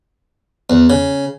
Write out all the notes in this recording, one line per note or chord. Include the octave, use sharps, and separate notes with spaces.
E2
C#3